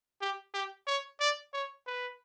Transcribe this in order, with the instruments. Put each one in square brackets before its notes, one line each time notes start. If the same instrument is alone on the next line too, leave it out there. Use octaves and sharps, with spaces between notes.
[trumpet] G4
G4
C#5
D5
C#5
B4